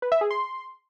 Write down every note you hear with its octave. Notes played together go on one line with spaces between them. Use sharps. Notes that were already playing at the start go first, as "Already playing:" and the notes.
B4
E5
G#4
C6